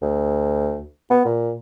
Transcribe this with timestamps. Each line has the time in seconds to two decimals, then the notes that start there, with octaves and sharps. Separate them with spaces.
0.02 D2
1.10 B3
1.25 A#2